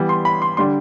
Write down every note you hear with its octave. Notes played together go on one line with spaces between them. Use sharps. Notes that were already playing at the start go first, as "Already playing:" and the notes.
Already playing: E3 G3 B3
C6
B5
C6
D3 G3 D4 C6